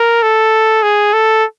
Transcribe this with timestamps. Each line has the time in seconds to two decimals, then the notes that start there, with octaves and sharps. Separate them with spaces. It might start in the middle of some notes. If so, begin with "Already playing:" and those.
Already playing: A#4
0.23 A4
0.83 G#4
1.13 A4